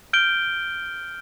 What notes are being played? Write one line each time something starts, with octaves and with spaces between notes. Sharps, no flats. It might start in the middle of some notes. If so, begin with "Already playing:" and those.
F6 G6 D7 G7